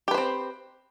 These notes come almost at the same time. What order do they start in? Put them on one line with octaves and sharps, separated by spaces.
G4 B4 C5 C4